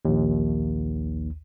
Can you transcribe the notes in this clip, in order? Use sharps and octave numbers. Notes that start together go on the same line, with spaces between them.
A#1 D#2